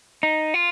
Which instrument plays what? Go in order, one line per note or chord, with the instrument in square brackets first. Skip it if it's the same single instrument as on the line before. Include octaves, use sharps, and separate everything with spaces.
[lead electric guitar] D#4
F4